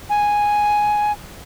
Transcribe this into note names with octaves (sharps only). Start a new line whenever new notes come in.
G#5